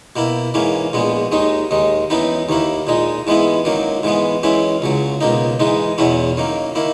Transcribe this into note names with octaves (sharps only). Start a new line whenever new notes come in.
B2 A#3 E4
G#2 E3 A#3 C#4
A#1 A#2 G#3 B3
D#2 D#3 G#3 D#4
D#2 D#3 G#3
F#2 E3 B3 D#4
D#2 D#3 A#3 E4
A#2 G#3 D#4
G#2 E3 G#3 B3 E4
F#2 D#3 F#3 A#3
G#2 E3 G#3 B3
F#2 E3 G#3 C#4 E4
C#2 C#3 F#3
C#2 B2 A#3 D#4
G#2 E3 G#3 D#4
E2 B2 F#3 C#4 E4
F#2 D#3 A#3
D#3 A#3 E4